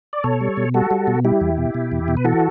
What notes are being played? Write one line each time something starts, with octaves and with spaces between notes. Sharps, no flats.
D5
B2 A4 C#5
G3
B2
G3 F#4 A4
G3
B2
G3 E4 G4
E2
B2
B2
E2
B2
B4
E3 F#4 A4